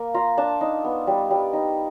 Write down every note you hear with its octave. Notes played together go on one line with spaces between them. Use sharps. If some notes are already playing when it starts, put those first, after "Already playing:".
Already playing: A#3
F4 A#5
D4 A5
D#4
B3
G3
G3
D#4